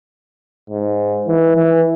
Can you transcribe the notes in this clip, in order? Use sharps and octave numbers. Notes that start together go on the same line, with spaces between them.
G#2
E3
E3